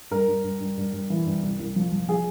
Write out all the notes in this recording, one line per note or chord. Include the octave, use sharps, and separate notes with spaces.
G2 A#4
G2
G2
G2
G2
G2
E3
G2
C2
C2
F3
F3
F3 G#4